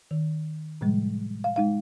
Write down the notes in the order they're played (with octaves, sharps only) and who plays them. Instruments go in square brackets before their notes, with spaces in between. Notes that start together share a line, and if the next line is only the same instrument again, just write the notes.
[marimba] D#3
A2 C3 F3 G3 G#3
F5
G#3 D#4 F5